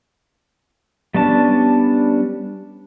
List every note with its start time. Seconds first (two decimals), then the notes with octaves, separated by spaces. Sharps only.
1.14 G3 B3 C#4 D4 A5